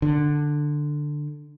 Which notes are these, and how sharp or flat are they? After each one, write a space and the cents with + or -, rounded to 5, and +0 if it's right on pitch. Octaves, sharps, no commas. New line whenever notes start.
D3 +10